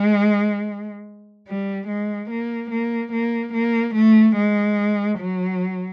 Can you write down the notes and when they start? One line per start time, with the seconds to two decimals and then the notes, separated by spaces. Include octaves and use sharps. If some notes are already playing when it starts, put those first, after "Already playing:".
Already playing: G#3
1.48 G3
1.88 G#3
2.30 A#3
2.71 A#3
3.12 A#3
3.54 A#3
3.95 A3
4.36 G#3
5.19 F#3